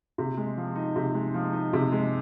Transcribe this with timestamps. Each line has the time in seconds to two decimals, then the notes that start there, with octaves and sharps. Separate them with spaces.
0.18 C3
0.37 G#3
0.57 F3
0.76 D#4
0.96 C3
1.14 G#3
1.34 F3
1.53 D#4
1.73 C3
1.92 G#3